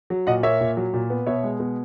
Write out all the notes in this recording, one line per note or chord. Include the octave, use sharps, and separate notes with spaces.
F#3
A#2 D#5 F#5
A#3 C#5 E5
A#2
F#3
A#2
B3
B2 C#5 E5
G#3
B2